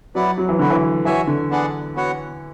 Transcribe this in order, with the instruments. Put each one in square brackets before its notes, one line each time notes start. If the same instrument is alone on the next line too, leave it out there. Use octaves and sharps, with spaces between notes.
[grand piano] F#3 [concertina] E4 B4 D5 F#5
[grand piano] F#3
E3
[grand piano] D3 [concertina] B3 F#4 B4
[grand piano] E3
[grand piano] E3 [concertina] F#4 C#5 E5 G#5
[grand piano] D3
[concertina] B3 D4 G#4 D5 F#5
B3 F#4 C#5 F#5